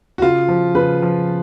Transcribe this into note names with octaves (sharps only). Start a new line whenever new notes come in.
F#4
C#3 F4
F3
C#3 B4
F3